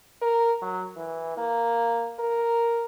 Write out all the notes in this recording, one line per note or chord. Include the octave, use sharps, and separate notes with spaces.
A#4
F#3
E3
A#3
A#4